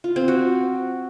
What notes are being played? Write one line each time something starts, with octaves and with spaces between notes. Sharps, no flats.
F4
C4
F#4